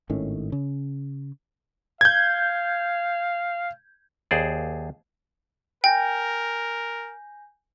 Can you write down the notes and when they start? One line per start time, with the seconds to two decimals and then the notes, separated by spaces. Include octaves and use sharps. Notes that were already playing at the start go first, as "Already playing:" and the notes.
0.10 G#1 A2 D#3 C#4
0.52 C#3
2.01 F5 G6 G#6
4.31 D#2 G#4 C5 D5
5.84 A#4 G5 G#5 G6 A#6